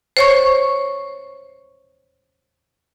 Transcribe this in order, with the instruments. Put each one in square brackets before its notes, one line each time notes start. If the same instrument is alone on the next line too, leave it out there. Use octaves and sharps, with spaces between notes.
[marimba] C5 C#5 C#6